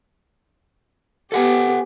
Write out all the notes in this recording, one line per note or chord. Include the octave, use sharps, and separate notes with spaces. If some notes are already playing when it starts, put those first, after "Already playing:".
B3 G4 A4 F#5 G#5